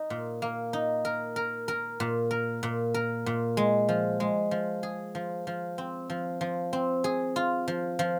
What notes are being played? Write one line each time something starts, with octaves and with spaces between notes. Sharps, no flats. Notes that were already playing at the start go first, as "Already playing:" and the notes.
Already playing: D#4
A#2
A#3
D#4
A#4
A#4
A#4
A#2
A#4
A#2
A#4
A#2
G#3
F3
G#3
F3
G#4
F3
F3
C4
F3
F3
C4
G#4
F4
F3
F3